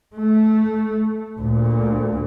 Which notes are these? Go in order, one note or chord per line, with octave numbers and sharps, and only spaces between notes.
A3
D2 A#2